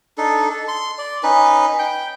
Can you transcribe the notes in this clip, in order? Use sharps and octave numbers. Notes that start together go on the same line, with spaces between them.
D4 D#4 A4
A4
C6
D5
C#4 D#4 B4
G5